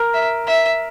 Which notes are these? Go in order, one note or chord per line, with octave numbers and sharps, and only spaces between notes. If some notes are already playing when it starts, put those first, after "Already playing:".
Already playing: A#4
E5
E5